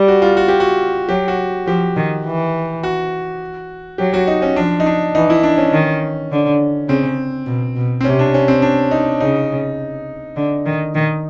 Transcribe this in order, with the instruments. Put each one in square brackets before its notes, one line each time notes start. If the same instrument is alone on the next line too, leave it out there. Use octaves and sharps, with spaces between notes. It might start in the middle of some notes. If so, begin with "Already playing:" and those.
Already playing: [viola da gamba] G3
[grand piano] F#4
F4
F#4
G4
F#4
[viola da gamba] F#3 [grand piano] G4
[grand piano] F#4
[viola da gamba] F3 [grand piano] G4
[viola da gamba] D#3
E3
[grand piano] F#4
[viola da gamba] F#3 [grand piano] G4
[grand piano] F#4
D#4
C#4
[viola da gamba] F3 [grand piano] D4
[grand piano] D#4
D4
[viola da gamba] E3 [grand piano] D#4
[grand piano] E4
D4
C#4
[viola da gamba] D#3
D3
[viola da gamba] C#3 [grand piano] C4
[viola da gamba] B2
B2
[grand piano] C4
[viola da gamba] C3 [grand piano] C#4
[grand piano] D4
C#4
C4
D4
D#4
[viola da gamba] C#3 [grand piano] D#4
[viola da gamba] D3
D#3
D#3